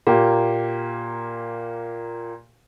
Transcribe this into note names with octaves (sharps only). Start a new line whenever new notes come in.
A#2 A#3 G4